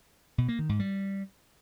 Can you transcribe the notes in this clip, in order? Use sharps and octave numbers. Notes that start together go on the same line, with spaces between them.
B2
A#3
D#3
G#2
G3